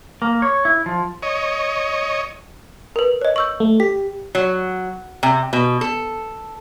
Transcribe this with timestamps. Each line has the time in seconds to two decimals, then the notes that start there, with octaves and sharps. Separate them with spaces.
0.22 A#3
0.42 C#5
0.65 E4
0.86 F3
1.23 C#5 D#5
2.96 A#4 B4
3.21 C#5 D#5
3.36 C#6 E6 G6
3.60 A3
3.80 G4 B6
4.35 F#3
5.23 C3
5.53 B2
5.81 A4